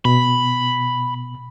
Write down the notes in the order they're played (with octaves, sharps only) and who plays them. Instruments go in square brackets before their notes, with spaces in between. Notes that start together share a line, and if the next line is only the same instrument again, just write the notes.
[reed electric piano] B2 [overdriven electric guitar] B5